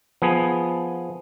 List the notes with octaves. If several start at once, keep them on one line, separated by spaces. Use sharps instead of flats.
F3 B3 G#4